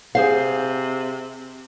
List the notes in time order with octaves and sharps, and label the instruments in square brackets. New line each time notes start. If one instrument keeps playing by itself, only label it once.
[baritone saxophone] C3 [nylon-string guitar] G#4 C5 F5